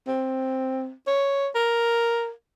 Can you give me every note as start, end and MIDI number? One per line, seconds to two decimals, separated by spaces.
0.08 0.92 60
1.07 1.49 73
1.55 2.31 70